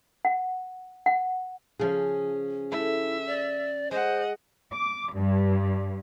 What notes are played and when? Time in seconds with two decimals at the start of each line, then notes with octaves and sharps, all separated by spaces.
0.25 F#5
1.06 F#5
1.79 C#3 F3 C#4 G#4
2.72 A3 E4 E5
3.27 D5
3.91 G#3 C5 D#5 F#5
4.73 D6
5.14 G2